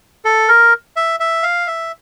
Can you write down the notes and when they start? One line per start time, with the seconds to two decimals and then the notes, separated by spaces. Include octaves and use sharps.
0.25 A4
0.49 A#4
0.96 E5
1.20 E5
1.43 F5
1.67 E5